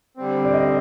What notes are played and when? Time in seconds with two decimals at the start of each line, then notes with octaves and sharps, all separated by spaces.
0.17 D3 G3 C4
0.44 D5
0.54 D#5